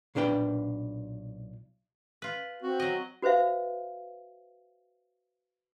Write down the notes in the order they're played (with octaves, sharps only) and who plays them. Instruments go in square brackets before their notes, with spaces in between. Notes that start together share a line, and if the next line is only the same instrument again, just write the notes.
[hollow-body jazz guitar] B1 A#2 D4 B4 G5
[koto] F4 B4
[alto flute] C4 [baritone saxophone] F#4
[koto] F#3 D#5
[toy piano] F#4 B4 C5 E5 F5